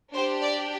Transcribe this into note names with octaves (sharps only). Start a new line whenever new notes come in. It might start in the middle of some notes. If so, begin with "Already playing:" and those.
D4 G4 C5
D5